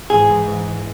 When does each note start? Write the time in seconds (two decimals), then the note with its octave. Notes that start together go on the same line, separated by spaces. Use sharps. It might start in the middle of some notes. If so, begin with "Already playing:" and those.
0.10 G#2 E3 G#4